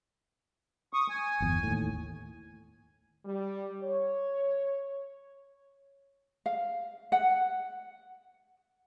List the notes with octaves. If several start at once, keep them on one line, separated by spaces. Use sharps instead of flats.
C#6 D#6
G#5
G1 E2
D#2 A2
G3
C#5
F5
F#5